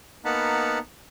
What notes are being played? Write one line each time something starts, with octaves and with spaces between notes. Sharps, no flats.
A#3 B3 D#4 F#5 A5 B5